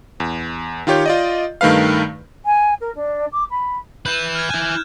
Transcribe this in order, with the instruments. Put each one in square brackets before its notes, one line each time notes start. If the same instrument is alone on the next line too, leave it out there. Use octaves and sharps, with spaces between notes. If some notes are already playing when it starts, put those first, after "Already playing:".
[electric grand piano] E2
D#3 F4 G4 C#5 G6
F4 D5 D#5
G2 D#3 A3 B4 F5
[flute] G#5
A#4
D4
D6
B5
[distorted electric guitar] E4 B4 [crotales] F#6 G6 E7
[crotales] F6 G#6
[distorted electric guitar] E4 G#5